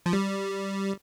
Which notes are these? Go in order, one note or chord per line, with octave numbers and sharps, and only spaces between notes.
F3
G3